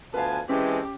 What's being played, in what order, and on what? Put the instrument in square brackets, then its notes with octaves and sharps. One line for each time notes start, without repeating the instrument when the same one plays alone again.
[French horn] D2 [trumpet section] B3 F4 G#5 [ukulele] B4 F5 [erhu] A5
[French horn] E3 [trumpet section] G#3 C4 A4 [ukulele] C#4 [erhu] G4